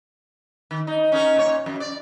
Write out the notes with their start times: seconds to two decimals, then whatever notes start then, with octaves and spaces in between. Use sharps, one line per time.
0.71 D#3
0.87 D#4
1.12 C#4 D#4 A#4
1.36 A#2 C#5
1.66 F#2
1.80 D5